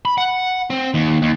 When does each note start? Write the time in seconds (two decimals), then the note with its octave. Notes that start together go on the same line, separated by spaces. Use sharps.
0.05 B5
0.18 F#5
0.70 C4
0.94 D#2
1.22 D#2